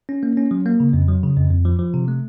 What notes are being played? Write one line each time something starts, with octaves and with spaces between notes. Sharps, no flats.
C#4
A#3
C#4
F#3
A#3
C#3
F2
F#3
C#3
F2
F2
F3
F3
C3
A3